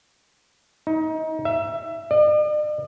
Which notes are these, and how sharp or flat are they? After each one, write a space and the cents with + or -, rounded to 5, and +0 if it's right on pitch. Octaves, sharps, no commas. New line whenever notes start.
D#4 +30
E5 +20
D5 +45